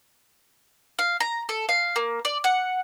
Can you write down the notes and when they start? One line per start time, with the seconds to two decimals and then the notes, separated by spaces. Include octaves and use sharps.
0.99 F5
1.20 A#5
1.49 A4
1.69 F5
1.96 A#3
2.25 D5
2.44 F#5